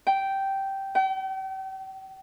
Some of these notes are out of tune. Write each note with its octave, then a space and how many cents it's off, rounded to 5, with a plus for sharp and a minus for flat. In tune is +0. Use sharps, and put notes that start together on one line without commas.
G5 -10
G5 -40